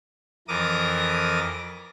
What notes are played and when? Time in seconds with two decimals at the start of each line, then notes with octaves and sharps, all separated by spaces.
0.48 F2 E3 A#4 D6 D#6 A#6